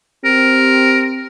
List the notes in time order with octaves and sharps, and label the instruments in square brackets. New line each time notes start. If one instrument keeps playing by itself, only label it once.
[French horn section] C4 G4 [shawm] A#4